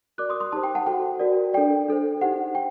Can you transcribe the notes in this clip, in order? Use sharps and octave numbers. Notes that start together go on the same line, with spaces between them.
F#4 A#4 D5 D6 F#6
C6 D#6
C6 D#6
D#4 G4 C5 A5 C6
G5
F#5 A5
F#4 A4 C5 G5
F#4 A#4 D5
D4 A4 D5 G5
D4 A4 C5
D#4 G4 C5 F#5
G5